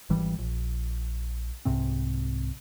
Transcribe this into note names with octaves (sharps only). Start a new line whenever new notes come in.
G#1 E3 G3
A#1
C2 G#2 C3 C4